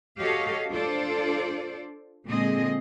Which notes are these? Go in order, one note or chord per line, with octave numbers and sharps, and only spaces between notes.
F#4 G4 A4 C#5 D#5 F5
D4 F4 A4 C5 D5
A#2 D3 G#3 C4 G#4 D#5